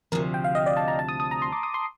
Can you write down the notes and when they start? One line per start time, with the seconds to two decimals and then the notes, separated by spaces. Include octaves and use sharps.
0.12 D2 C3 F3 A#4
0.34 G5
0.44 F5
0.55 D#5
0.66 D5
0.77 A5
0.88 A#5
0.99 A5
1.09 D#6
1.20 D#6
1.31 A#5
1.42 C6
1.52 D6
1.63 D#6
1.74 C6